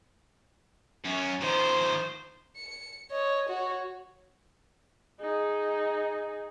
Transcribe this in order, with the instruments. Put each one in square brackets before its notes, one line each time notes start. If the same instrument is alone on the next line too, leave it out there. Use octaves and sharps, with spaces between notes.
[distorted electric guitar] F#2 C#4
[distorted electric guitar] D#3 F3 [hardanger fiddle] C5
[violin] C#7
C#5 D#5
F#4 C#5
[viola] D#4 G#4